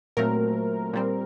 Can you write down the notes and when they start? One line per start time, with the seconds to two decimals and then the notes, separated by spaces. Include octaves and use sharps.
0.17 A#2 F#3 A3 C4 A#4
0.93 A#2 G3 C4